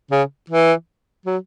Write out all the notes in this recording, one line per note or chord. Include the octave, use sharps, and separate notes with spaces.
C#3
E3
F#3